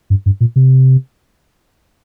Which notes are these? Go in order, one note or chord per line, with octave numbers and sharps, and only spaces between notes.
G2
G2
A#2
C3